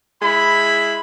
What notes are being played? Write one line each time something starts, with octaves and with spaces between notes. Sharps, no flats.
G#3 E4 B5